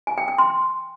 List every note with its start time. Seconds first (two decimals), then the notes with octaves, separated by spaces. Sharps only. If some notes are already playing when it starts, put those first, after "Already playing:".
0.07 G#5
0.18 G5
0.28 G5
0.38 C6